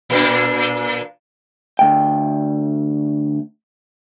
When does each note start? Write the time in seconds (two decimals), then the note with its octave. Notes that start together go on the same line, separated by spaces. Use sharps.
0.10 A#2 A#3 D4
1.79 D2 G5